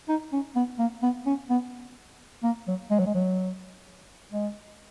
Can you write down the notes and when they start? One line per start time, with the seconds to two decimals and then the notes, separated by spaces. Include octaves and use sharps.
0.09 D#4
0.33 C#4
0.56 B3
0.79 A#3
1.02 B3
1.26 C#4
1.50 B3
2.44 A#3
2.68 F#3
2.91 G#3
2.99 F#3
3.06 G#3
3.14 F#3
4.32 G#3